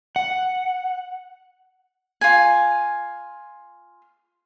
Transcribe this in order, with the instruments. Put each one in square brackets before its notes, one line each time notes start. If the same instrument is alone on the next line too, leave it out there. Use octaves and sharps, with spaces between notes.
[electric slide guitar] F#5
[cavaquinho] F4 G#5